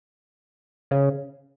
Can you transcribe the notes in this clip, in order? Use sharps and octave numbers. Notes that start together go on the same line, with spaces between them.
C#3